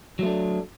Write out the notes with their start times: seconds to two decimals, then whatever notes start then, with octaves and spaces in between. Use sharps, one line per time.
0.19 F#3
0.23 A3
0.26 D4